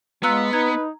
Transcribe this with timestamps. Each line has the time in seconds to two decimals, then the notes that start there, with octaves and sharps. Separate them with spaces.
0.23 G#3 B3 F4 A#5 E6 F#6
0.53 D#4 B4 A#5 G#6